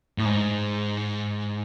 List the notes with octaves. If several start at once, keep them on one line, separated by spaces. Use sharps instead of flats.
A2
G#2